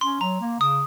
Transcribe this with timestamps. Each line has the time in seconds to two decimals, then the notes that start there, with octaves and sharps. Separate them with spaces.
0.01 C#4 C6
0.21 F#3 A#5
0.41 A#3
0.60 C#3 D#6